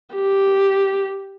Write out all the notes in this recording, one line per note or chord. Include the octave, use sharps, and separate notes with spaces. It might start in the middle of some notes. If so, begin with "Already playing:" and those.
G4